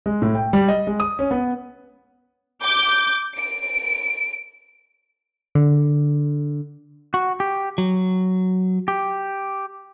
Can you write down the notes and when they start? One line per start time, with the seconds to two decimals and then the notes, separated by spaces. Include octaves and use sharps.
0.06 G#3
0.22 A2
0.35 G5
0.53 G3
0.68 D#5
0.87 G#3
1.00 D#6
1.19 C#4
1.31 B3
2.63 D6 G6
3.39 D7
5.55 D3
7.14 F#4
7.40 G4
7.78 F#3
8.88 G4